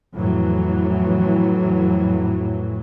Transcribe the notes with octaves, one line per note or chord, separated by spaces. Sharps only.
F2 A2 E3 F#3